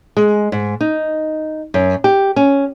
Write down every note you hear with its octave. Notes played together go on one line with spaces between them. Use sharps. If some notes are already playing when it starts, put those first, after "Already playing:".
G#3
G#2
D#4
F#2
G4
C#4